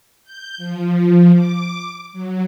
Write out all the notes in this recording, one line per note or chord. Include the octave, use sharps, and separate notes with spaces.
G6
F3
D6
F#3